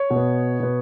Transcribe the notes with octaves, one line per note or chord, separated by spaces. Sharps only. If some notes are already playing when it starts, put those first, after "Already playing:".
Already playing: C#5
B2
B3
B2 B3